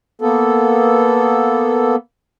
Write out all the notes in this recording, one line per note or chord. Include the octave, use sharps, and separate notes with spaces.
A#3 B3 A4